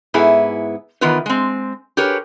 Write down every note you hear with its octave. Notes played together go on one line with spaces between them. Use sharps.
G#2 B3 E4 G#4
D#3 E3 B3 F4 A#4 B4
G#3 C4
G4 G#4 A#4 B4 C#5